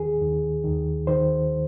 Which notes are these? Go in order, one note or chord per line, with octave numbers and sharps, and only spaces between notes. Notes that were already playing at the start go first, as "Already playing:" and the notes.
Already playing: D#2 D#3 G#4
D#2 D#3
D#2 D#3
D#3 C5